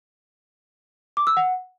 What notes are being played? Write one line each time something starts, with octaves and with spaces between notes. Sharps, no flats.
D6
E6
F#5